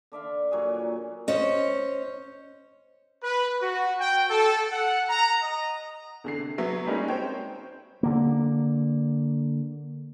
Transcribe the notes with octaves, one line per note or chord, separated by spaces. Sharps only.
D3 D5 E5 F5
A#2 F#3 G3 G#4
C#4 C5 C#5 D#5
B4
F#4
G5
A4
F#5
A#5
D#5
E2 D3 C7
C3
F#3 B3 E5
G3 G#3 A#3 C#4 D#4 G#4
C4 C5 C#5 G5
D3 A#3